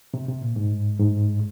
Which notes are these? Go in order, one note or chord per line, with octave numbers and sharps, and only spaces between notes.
C3
C3
A#2
G#2
G#2